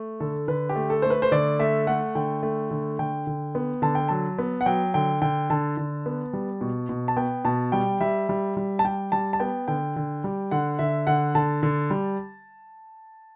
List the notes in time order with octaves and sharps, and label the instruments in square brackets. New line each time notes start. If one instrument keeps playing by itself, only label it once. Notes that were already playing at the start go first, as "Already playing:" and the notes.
Already playing: [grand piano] A3
D3 A4
D3 B4
G4
A3
A4
A3 C5
B4
C5
D3 D5
A3 E5
A3 F#5
D3 G5
A3
D3
D3 G5
D3
B3
D3 A5
G5
F#3 A5
B3
F#5
F#3 G5
D3 G5
D3 G5
D3 A5
D3
B3
G3
B2
B2
A5
B3 G5
B2 A5
G3 G5
G3 E5
G3
G3
A5
G3 G5
G3 A5
A5
B3 G5
D3 G5
D3
G3
D3 F#5
D3 E5
D3 F#5
D3 A5
D3
G3